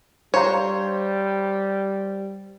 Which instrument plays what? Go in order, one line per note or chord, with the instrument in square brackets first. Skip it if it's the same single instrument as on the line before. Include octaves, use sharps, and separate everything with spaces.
[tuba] G3 [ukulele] D4 F5 A#5 [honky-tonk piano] C5 [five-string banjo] C#5